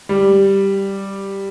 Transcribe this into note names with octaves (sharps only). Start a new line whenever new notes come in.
G3